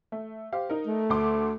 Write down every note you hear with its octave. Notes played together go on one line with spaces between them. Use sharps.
A3
G4 C5 F5
D#4 A#4
A3
D2 C6 D6